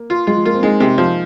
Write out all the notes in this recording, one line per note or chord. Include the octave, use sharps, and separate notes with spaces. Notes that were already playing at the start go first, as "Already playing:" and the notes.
Already playing: A#3
F4
G#3 F4
F3
A#3 F4
C4
G#3 D#4
C3
F3